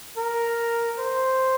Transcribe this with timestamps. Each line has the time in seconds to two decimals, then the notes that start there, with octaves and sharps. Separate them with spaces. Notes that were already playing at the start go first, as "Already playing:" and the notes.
0.17 A#4
0.99 C5